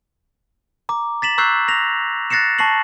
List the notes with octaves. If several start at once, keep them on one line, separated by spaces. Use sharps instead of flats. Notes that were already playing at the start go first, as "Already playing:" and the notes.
A#5 D6
A6 B6 E7 F#7
A#5 C#6 E6 F#6 G6 C7
A#6 E7 F7
F#6 A6 A#6 C7 C#7 E7
A5 C#6 A#6 C7 F#7